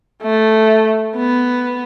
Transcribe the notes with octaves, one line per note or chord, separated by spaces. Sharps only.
A3
B3